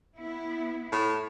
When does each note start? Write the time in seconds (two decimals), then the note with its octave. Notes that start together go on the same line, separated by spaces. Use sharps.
0.18 B3 E4
0.92 A2